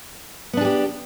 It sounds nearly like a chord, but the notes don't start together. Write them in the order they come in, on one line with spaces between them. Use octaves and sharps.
B3 D4 G#4 G4